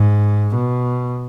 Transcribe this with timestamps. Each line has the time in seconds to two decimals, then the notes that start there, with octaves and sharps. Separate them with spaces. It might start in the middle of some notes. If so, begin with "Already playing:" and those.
Already playing: G#2
0.55 B2